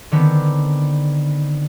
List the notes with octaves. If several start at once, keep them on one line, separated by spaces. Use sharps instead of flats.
D3 D#3 B3 C4